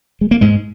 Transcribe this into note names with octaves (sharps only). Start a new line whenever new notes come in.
G#3
A#3
G#2 G#3